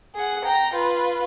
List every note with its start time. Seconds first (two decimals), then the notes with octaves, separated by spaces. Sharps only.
0.15 G#4 F#5
0.46 G5 A#5
0.74 F4 B4